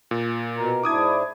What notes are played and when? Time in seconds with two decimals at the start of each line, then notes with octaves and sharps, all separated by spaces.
0.11 A#2
0.56 B2 A#4
0.83 G#2 D4 E4 D6 D#6 G#6